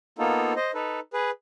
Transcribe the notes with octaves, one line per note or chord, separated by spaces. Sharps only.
A#3 B3 D#4 F4 A4
C5 D#5
D#4 A4 B4
G#4 B4